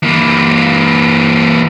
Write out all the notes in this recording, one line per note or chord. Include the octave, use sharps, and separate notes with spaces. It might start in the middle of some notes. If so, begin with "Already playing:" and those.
E3 A#3